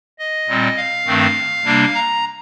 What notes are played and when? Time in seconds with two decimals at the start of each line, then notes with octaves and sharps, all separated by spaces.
0.19 D#5
0.48 A#2 G3 C4
0.77 F5
1.06 G2 D#3 A3 C4
1.65 C3 G3 A#3 D4
1.94 A#5